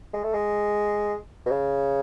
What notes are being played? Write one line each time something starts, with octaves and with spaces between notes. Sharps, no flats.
G#3
A3
G#3
B2
C#3